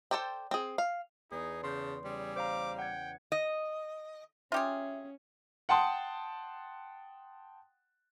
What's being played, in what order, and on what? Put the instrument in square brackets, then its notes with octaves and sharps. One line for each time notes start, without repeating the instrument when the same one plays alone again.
[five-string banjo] A4 A#4 C5 D5 G5
C4 G#4
F5
[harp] E2 [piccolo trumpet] D#4 [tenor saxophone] G#4
[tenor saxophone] C#3 [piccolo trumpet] A5 [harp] C6 G6
[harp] C#3 [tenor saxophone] G3 [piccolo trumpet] G#4
[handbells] C5 F5 A#5 [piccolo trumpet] D6
[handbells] F#5 G#6 [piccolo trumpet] G5
[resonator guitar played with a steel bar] D#5
[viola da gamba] C#4 [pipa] F4 G4 G#4 [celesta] E5
[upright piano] F#5 G5 A5 C6 D#6